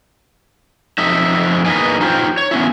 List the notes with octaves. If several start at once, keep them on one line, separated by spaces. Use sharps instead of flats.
F2 D#4 E5
E2 A#3 D#4 B4 D#5 G#5
D#4 F4 G4 C5
C#5
B3 C#4 E4